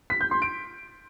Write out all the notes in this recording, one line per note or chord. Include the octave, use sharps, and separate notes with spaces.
B6
G6
C6
D7